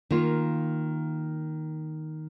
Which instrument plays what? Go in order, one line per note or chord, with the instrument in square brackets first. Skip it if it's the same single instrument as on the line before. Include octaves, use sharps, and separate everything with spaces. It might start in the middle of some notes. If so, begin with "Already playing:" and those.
[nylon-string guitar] D#3 A#3 F4